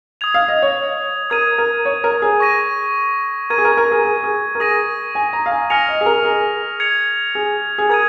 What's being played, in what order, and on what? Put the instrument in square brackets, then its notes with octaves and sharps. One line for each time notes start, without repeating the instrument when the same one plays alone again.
[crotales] D#6 G#6 F7
[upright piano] F5
D#5
C#5
[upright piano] A#4 [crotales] D#6 G#6 D#7
[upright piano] A#4
C#5
A#4
G#4
[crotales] C#6 A#6 D#7
[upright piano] A#4 [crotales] G#6 D#7
[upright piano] G#4
A#4
A#4
G#4
G#4
G#4
A#4
[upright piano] G#4 [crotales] D#6 A#6 D#7
[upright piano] G#5
A#5
F5
G#5
[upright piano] G#5 [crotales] F6 A#6 C#7 F7
[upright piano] D#5
G#4
A#4
G#4
[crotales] G#6 C#7 F7
[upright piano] G#4
G#4
[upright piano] A#4 [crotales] D#6 G#6 D#7